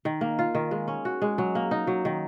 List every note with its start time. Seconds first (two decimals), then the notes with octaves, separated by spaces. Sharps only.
0.05 D#3
0.21 A#3
0.39 F4
0.55 D#3
0.71 G#3
0.88 C#4
1.05 F#4
1.22 G#3
1.38 F#3
1.55 A#3
1.71 D#4
1.87 F#3
2.05 D#3